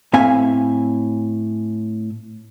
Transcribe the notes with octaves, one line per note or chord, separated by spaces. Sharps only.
A2 C4 E5 F5 G#5